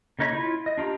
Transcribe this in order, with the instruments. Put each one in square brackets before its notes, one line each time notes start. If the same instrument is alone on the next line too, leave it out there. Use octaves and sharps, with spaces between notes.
[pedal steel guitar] C#3 A#3 D#4 C#5 B5
E4 F4
D#5
D4 F4 G4 A#5